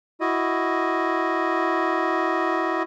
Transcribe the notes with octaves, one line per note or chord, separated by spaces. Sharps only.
E4 F#4 D#5